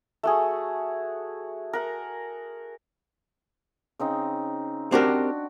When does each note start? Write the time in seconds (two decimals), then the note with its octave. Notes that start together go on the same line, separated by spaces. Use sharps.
0.23 A3 F#4 G#4
1.73 A#4 F#5
3.99 C#3 C4 D#4
4.92 C4 D4 F#4 G4 A#4